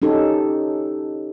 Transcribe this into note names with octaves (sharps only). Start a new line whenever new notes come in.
C#4 D#4 G4 A4